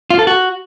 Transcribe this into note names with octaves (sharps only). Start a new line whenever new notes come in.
F4
A4
F#4